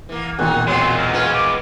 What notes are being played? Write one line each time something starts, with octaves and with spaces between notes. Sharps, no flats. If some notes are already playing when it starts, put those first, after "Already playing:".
E3 A#3
E1 A#2 D#3 D#4 F#5
F#3 G#3 B3 C4 C6
A#4
C#4 F4 B4
D6